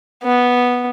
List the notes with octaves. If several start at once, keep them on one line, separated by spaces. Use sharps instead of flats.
B3